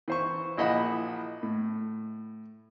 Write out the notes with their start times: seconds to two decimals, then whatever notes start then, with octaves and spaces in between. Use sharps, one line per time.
0.08 E3 C5 C#6
0.57 A#1 E4 D#5 F#5 B5
1.43 A2